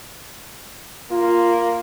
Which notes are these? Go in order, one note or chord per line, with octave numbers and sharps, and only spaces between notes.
A#3 F4